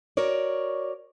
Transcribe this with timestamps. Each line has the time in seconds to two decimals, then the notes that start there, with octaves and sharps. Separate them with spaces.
0.17 F#4 A#4 C#5 D5